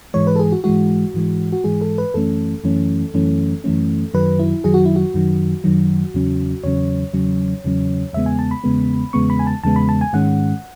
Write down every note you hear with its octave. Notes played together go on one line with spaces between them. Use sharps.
G#2 E3 G#3 C#5
B4
A4
G#4
F#4
G#2 E3 G#3 F#4
G#2 E3 G#3
F#4
G#2 E3 G#3 G#4
A4
B4
F#2 E3 A3 C#4 A4
F#2 E3 A3 C#4
F#2 E3 A3 C#4
F#2 E3 A3 C#4
F#2 D#3 F#3 B4
E4
F#2 D#3 F#3 G#4
F#4
E4
F#4
F#2 D#3 F#3
F#2 D#3 F#3
E2 C#3 F#3 C#4
E2 C#3 F#3 C#4 C#5
E2 C#3 F#3 C#4
E2 C#3 F#3 C#4
E2 C#3 G#3 B3 E5
G#5
A5
B5
E2 C#3 G#3 B3
E2 C#3 G#3 B3 C#6
B5
G#5
A5
E2 C#3 G#3 B3 A5
B5
A5
G#5
G#2 D#3 G#3 C#4 F#5